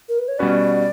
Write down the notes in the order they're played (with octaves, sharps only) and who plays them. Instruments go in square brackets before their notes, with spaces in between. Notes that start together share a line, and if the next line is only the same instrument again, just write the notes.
[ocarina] A#4
B4
C#5
[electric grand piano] B2 G3 C#4 F#4 B4 [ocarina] D5